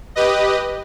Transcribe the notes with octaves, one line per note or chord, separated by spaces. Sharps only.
G4 B4 D#5